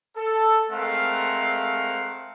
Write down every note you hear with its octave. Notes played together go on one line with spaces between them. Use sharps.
A4
G#3 A3 C4 A#4 F5 F#5